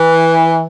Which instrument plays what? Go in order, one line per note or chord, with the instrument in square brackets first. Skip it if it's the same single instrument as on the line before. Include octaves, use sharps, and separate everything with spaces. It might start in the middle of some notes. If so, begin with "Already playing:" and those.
Already playing: [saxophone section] E3